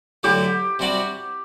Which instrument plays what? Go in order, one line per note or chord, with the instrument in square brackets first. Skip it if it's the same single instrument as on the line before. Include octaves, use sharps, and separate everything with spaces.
[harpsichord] D3 F#3 A3 E4 [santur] G4
[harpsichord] C3 G3 D4 F#4